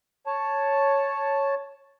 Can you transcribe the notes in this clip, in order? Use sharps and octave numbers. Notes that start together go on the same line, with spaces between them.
C#5 A5